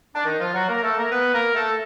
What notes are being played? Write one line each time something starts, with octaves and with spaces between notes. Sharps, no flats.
D4
D#3 D#4
F3 F4
F#3 F#4
A#3 A#4
A3 A4
A#3 A#4
B3 B4
A#3 A#4
A3 A4